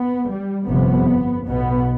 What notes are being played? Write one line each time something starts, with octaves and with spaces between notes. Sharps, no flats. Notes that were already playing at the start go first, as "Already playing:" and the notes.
Already playing: B3
G3
G1 F2 C3 B3
B1 B2 B3